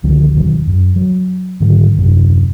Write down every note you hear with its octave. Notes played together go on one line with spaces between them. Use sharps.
C#2 D3 D#3 F3
E1 D#3 F#3
F#2
F#3
G#2 D3 D#3 F#3
D#1 F#2 C3